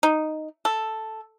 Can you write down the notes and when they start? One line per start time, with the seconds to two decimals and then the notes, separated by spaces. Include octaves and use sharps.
0.03 D#4
0.65 A4